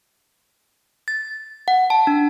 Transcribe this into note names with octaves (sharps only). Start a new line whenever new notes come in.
A6
F#5
A5
D4